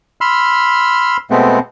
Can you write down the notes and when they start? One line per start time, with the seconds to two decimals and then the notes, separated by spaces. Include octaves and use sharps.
0.21 B5 C6 E6 F6
1.31 B2 G#3 A3 B3 C4